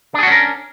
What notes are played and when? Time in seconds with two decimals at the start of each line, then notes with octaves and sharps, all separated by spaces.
0.14 D4
0.19 G#4
0.23 F#4
0.27 C#4
0.32 A#4